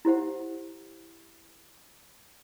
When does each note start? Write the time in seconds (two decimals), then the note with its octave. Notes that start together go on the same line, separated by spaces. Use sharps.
0.05 E4 G4 C5 F#5